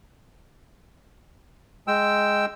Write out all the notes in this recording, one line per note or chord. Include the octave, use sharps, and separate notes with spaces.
G#3 G5 E6